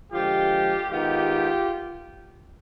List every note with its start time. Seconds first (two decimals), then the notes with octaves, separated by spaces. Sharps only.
0.12 D3 F3 G#3 F4 G4
0.89 D#3 G#3 B3 D#4 F4 G4